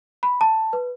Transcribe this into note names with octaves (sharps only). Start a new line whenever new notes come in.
B5
A5
B4